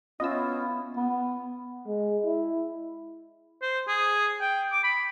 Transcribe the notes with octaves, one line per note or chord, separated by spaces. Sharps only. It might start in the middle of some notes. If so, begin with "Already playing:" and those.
B3 C#4 E4 F4 B4 D#5 E6
B3
G#3
E4
C5
G#4
G5
D6
B5